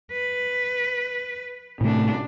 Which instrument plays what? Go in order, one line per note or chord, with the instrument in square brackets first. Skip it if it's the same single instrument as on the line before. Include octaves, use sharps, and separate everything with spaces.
[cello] B4
[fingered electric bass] A2 C3 A3 [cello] C#4 D4